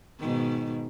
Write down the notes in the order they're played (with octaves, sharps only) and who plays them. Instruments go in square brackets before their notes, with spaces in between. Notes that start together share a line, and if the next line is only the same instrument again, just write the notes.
[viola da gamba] G#2 B2 D#3